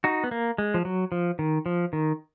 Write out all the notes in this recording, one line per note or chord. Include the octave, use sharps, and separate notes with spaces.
D#4 F#4
B3
A#3
G#3
F3
F#3
F3
D#3
F3
D#3